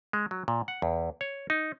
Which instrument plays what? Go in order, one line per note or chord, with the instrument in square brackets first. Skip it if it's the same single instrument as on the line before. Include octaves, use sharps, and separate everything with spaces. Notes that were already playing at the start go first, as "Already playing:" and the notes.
[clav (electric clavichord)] G#3
F#3
A#2
F#5
E2
C#5
D#4